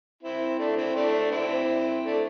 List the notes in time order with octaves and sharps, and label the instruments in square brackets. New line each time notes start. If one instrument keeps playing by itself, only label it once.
[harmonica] C4 E4
A3 D4
C4 E4
A3 D4
C4 E4
A3 D4